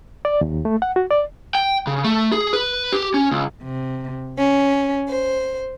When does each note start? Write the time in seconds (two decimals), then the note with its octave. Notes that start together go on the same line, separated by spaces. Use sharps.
0.25 D5
0.41 D#2
0.65 A3
0.82 F#5
0.96 F#4
1.11 D5
1.55 G5
1.87 C#3
2.04 A3
2.32 G#4
2.53 B4
2.93 G4
3.14 C#4
3.31 C#2
3.64 C3
4.37 C#4
5.07 C5